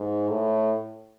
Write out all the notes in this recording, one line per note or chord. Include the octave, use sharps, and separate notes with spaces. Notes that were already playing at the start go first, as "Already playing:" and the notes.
Already playing: G#2
A2